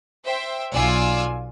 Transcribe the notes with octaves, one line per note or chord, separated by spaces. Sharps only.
C5 E5 G5
B1 F4 D5 G#5 E6